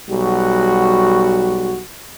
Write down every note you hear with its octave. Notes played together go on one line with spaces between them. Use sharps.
B1 G3 F#4